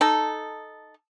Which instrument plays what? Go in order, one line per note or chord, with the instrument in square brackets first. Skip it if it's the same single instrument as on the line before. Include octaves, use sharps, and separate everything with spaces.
[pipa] D#4 A4